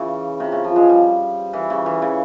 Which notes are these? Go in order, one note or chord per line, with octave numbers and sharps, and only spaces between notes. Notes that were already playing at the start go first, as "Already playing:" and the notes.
Already playing: C#3 E3
C3
C#3
F3
G#3
G3
E3
C#3
E3
C#3